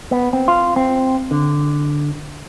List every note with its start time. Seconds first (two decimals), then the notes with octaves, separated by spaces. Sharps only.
0.11 B3
0.33 C4
0.48 F4
0.76 C4
1.31 D3